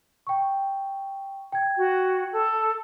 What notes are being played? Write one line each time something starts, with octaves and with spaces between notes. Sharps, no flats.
G5 C#6
G5 G#6
F#4
A4